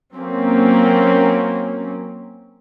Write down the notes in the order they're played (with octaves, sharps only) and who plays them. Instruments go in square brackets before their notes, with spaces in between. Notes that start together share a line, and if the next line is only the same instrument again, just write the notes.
[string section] F#3 A#3 C4 C#4